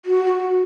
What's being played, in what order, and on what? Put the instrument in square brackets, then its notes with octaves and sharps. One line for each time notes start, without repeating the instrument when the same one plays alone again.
[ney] F#4